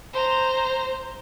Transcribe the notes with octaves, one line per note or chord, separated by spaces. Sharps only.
C5 A#5